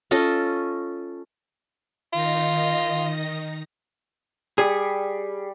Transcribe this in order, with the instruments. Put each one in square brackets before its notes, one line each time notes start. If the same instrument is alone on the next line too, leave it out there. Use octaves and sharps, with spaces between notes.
[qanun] C#4 F4 A4 D#5
[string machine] D#3 D#4 A#6 [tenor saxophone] F4
[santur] G3 [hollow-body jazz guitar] G#4